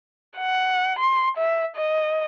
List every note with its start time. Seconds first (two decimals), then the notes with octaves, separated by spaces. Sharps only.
0.38 F#5
0.99 C6
1.37 E5
1.76 D#5